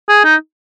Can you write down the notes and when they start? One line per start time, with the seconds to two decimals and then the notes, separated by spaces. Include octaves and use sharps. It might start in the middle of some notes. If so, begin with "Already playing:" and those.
0.09 G#4
0.24 D#4